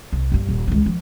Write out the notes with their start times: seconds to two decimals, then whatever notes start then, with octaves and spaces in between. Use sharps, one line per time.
0.13 C2
0.32 G1 G2
0.49 D#1
0.68 C#2 D#3
0.86 F3